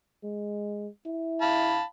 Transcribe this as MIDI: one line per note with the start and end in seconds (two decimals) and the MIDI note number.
0.23 0.88 56
1.06 1.82 64
1.41 1.83 77
1.41 1.83 81
1.41 1.83 83